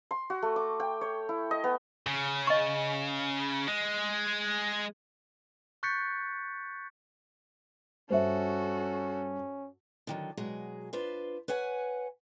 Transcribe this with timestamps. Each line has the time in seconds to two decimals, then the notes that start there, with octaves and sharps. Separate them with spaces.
0.11 C6
0.30 F#4
0.42 A3
0.56 D6
0.80 G5
1.01 C#5
1.29 E4
1.51 D#5
1.64 B3
2.06 C#3
2.47 D#5 C#6
3.68 G#3
5.83 C#6 F#6 G6 A6 B6 C#7
8.10 G2 C#4 F#4 A4 C5 E5
10.07 D3 D#3 F#3
10.37 B2 F#3 G#3 G#4
10.93 D4 F4 B4 C5
11.48 B4 C#5 F#5 G#5